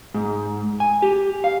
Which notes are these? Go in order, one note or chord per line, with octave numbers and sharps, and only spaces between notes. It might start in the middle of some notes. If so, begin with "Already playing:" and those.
G#2
G#5
G4
F5